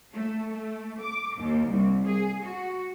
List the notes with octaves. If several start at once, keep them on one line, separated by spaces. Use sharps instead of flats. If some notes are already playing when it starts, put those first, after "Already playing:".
A3
A3
D6
D#2
C2
G#4
F#4